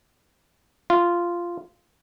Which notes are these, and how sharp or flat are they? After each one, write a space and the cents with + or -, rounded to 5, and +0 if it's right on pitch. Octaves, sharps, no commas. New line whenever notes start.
F4 -10